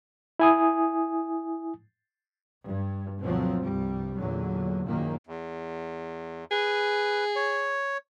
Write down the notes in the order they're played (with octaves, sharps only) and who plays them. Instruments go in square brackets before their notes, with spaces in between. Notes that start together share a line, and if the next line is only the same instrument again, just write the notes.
[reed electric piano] E4 G#5 D#6
[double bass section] G2
D2 B2 F3 F#3 C4
C2 G2 G3
E2 A#2 D3 F#3
A#1 F#2 A#2 D#3 A#3
[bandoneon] E2
[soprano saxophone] G#4 [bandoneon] B4
[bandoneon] C#5